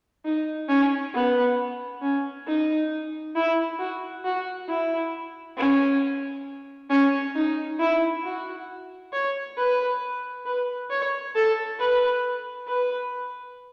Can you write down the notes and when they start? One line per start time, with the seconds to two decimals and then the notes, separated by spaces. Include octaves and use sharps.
0.25 D#4
0.69 C#4
1.14 B3
2.02 C#4
2.47 D#4
3.35 E4
3.79 F#4
4.25 F#4
4.68 E4
5.57 C#4
6.90 C#4
7.36 D#4
7.79 E4
8.24 F#4
9.13 C#5
9.57 B4
10.46 B4
10.90 C#5
11.35 A4
11.79 B4
12.68 B4